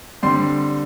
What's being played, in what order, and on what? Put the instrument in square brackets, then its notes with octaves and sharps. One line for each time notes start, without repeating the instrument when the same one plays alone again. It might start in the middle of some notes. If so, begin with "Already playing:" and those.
[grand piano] D3 G3 C4 C6